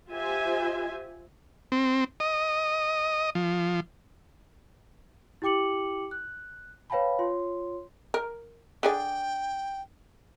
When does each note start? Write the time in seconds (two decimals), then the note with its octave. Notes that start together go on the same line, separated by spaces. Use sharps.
0.10 F4 G4 C5 E5 G#5
1.72 C4
2.20 D#5
3.35 F3
5.42 E4 G4 G5 D6 C#7 F#7
6.11 F#6
6.90 B4 C#5 F5 G5 A5 B5
7.19 F4 C#5 C6
8.14 A#4
8.83 D3 G#4 D5 G5